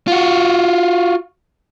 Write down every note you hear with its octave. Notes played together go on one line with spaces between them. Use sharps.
F4 F#4